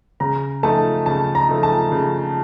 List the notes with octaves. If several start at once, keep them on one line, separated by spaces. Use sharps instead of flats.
C#3 A#5
F3 A3 D#4 A5
C#3 A5
A#5
F3 A3 D#4
A5
C#3